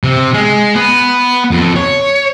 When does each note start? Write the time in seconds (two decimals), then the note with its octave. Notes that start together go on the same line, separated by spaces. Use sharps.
0.04 C3
0.34 G#3
0.75 B3
1.51 F2
1.76 C#5